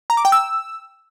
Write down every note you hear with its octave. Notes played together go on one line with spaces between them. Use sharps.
A#5
D6
G5
E6